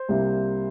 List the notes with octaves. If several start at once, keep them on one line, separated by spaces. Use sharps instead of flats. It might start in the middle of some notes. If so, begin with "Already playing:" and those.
Already playing: C5
C2 C3 G3 A#3